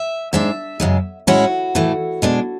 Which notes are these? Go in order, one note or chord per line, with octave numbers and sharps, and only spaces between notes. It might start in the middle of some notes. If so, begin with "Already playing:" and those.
Already playing: E5
G#2 G#3 D4 E5
F#2 C#3 G#3
A2 G#3 C#4 E4 F#4
A2 E3 A3
B2 G#3 D4